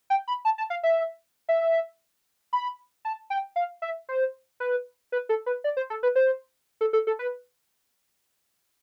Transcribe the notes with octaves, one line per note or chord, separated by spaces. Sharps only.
G5
B5
A5
A5
F5
E5
E5
B5
A5
G5
F5
E5
C5
B4
B4
A4
B4
D5
C5
A4
B4
C5
A4
A4
A4
B4